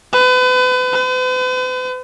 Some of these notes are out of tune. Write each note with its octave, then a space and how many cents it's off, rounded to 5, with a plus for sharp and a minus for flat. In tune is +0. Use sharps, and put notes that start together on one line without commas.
B4 +35
B4 +45